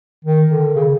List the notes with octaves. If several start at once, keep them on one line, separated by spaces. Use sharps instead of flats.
D#3
D3
C#3